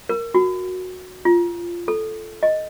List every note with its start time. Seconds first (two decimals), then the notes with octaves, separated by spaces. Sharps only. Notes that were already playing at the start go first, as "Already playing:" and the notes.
0.09 A#4
0.34 F#4
1.25 F4
1.88 A4
2.43 D#5